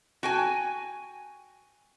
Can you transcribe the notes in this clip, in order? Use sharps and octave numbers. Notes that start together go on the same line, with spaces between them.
F#4 G5 G#5